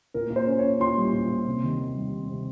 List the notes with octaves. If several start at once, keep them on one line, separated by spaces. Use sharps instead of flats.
A#2 A#4
A#2
C5
C#4
C#4 C#5
A#2 C6
G3
A#2
A#2
C3
D#3
D#3
G3
C3
C3